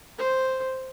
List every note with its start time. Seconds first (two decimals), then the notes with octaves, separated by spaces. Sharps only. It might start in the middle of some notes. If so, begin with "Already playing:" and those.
0.18 C5